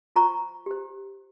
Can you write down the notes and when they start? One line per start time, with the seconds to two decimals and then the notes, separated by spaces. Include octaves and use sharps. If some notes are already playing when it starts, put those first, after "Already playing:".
0.16 F4 C5 A#5 C#6
0.66 G4 C5